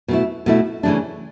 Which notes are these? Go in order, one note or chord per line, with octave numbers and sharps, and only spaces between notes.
B2 A3 E4
B2 A3 E4
C#3 E3 A3 D4